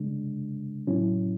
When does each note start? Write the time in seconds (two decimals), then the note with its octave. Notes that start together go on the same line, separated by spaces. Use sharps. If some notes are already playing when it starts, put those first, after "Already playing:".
Already playing: C#3 G#3 D4
0.87 A2 F#3 C#4 E4